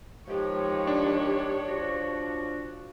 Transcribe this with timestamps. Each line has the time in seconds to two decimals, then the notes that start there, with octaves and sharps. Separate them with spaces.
0.28 D#3 F3 G#3 G4 C#5
0.87 D4
1.69 F3 F#4